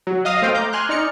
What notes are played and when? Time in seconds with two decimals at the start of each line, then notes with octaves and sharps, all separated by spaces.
0.07 F#3
0.25 D#5 F5 D#6 A#6
0.42 A3 C5 F5 G5
0.55 A#5 D6 G6
0.73 G#5 C6 F6 F#6
0.89 D#4 D5 F6 C#7